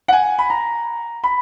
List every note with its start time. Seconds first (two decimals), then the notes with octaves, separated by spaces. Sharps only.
0.08 F#5
0.13 G#5
0.39 B5
0.50 A#5
1.24 B5